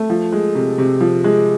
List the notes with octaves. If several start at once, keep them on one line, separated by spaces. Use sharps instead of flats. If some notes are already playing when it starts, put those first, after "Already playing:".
Already playing: A3
F3
G#3
C3
C3
F3
G#3